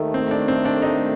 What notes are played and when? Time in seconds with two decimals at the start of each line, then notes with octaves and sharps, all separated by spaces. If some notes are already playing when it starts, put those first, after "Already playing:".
Already playing: D#2 D#3 A3
0.14 C4
0.31 D4
0.48 C4
0.65 D4
0.82 D#4